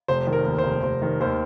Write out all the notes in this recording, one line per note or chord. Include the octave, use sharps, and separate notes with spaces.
F1 C5
D#3
A#4
D#2
C5
F1
F1 C5
D#3
D#2 C5